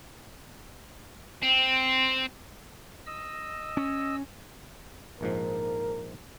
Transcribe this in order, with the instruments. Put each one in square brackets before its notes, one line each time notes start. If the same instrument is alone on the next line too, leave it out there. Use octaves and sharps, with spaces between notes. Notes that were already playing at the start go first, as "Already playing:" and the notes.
[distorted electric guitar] C4
[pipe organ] D#5 E6
[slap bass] C#4
[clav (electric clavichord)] A#1 G#2 F3 [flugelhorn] A#4